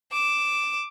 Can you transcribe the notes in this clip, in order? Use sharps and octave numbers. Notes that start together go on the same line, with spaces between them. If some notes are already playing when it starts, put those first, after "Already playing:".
D6 E7